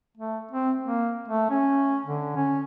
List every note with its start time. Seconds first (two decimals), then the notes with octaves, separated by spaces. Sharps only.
0.17 A3
0.51 C4
0.84 A#3
1.28 A3
1.50 C#4
2.06 D3
2.36 C#4